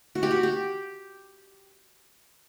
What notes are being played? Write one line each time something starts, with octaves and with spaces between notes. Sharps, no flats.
F#4
G4
F#4
G4